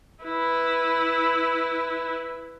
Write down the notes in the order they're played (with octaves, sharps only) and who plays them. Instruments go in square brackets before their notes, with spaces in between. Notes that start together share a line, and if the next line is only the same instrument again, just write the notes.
[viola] E4 B4